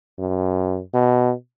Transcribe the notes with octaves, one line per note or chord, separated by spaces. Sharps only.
F#2
B2